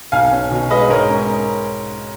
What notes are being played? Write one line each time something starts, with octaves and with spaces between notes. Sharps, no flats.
B1 F5 G#5
C#4
B2
G#3 B4 D#5
G#2 A#4 C#5
C#4